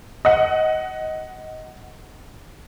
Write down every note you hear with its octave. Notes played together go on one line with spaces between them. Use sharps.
D#5 F#5